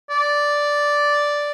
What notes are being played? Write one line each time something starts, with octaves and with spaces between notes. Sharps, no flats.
D5